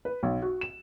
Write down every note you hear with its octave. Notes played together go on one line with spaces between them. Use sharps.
B4
B1
F#4
E7